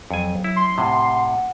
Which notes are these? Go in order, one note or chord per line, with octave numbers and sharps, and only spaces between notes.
F2 F#3 G#5
E4
C6
A2 C3 F#5